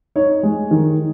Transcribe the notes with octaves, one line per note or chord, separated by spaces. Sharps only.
D#4 C#5
G#3
D#3